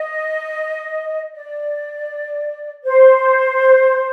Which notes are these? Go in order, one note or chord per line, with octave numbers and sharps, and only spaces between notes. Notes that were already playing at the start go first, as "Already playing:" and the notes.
Already playing: D#5
D5
C5